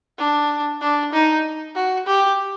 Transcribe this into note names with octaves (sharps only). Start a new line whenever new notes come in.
D4
D4
D#4
F#4
G4